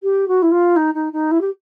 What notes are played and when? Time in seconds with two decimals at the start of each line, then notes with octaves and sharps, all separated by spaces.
0.03 G4
0.28 F#4
0.42 E4
0.51 F4
0.76 D#4
0.94 D#4
1.13 D#4
1.31 E4
1.41 G4